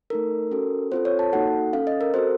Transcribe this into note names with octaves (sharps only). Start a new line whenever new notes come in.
A3 D#4 A4 A#4
C#4 F#4 A4
C4 F4 A4 C5
C#5
A5
A#3 D#4 F#4 A4 F#5
C#4 A4 F5
D#5
A#4
C4 F#4 A4 C5